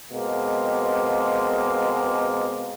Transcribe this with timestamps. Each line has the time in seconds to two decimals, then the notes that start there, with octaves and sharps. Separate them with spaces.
0.11 B2 G#3 A#3 C4